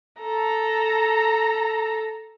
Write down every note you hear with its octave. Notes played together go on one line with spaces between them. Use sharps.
A4 A#5